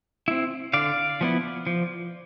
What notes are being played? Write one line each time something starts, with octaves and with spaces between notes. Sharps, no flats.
C4 E4
D3 D5 F5
F3 B3 E4
F3